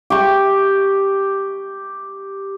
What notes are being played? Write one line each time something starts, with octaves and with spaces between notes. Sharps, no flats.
G4 C#6